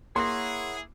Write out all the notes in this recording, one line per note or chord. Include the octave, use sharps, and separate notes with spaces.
A#3 E4 G#4 C#5 F#5 A#5 C6